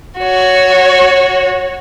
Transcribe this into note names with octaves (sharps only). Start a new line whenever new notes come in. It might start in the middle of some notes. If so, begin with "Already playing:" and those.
F#4 C#5